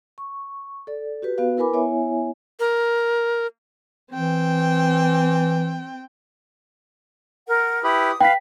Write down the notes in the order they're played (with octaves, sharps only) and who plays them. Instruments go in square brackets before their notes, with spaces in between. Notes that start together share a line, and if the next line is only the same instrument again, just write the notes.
[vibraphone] C#6
A4 D5
F#4 G4 B4
B3 F#4 B4 F5
E4 A#4 B4 G#5 B5 D6
B3 E4 C#5 E5 G#5
[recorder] A#4
[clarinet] E3 [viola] C4 G5
[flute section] A#4 F#5
[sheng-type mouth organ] E4 G4 B4 [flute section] D#6
[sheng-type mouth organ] B4 [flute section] F5 [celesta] G5 B6